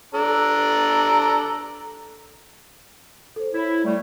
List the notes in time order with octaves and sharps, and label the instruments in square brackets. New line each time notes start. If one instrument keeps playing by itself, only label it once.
[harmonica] D4 A4 A#5
[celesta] A4 C5
[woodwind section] E4 [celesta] A4 C#5
[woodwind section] G3 A3